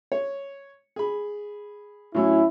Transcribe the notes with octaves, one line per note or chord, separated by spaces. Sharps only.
C#5
G#4 B5
A2 F#3 C#4 E4